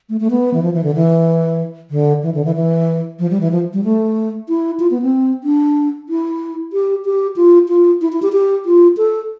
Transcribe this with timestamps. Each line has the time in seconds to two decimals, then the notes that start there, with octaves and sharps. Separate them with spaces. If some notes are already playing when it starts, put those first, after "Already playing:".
0.09 A3
0.20 A3
0.30 B3
0.54 E3
0.63 F3
0.74 E3
0.84 D3
0.95 E3
1.91 D3
2.23 E3
2.34 D3
2.45 E3
2.55 E3
3.19 F3
3.31 G3
3.41 E3
3.51 F3
3.73 G3
3.84 A3
4.49 E4
4.80 F4
4.91 B3
5.02 C4
5.44 D4
6.09 E4
6.73 G4
7.05 G4
7.36 F4
7.68 F4
8.01 E4
8.12 E4
8.22 G4
8.33 G4
8.65 F4
8.97 A4